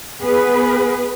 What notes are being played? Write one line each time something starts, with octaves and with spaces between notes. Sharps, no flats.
B3 G#4 B4